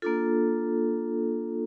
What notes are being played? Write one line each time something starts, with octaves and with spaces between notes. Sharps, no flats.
A#3 D4 F4 A4